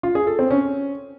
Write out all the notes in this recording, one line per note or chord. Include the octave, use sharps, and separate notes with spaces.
F4
G#4
A4
C4
C#4